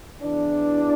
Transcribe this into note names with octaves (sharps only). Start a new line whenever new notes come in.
E2 E3 D4